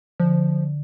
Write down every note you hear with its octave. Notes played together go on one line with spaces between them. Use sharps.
D3 F3